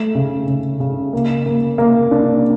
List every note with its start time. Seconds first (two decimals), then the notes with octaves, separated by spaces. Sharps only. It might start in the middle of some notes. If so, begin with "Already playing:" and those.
Already playing: A3
0.15 C#3
0.47 C#3
0.80 C#3
1.13 A#3
1.46 A#3
1.78 A#3
2.11 D4